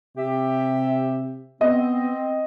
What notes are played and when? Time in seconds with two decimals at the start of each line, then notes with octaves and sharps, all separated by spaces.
0.18 C3 G4 E5
1.61 B3 C4 D#5